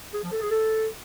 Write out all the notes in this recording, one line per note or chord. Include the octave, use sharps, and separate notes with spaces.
G#4
F3
A4
G#4
A4